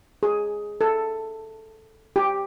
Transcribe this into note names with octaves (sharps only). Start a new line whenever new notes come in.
G#4
A4
G4